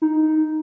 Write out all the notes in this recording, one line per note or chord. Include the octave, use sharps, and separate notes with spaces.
D#4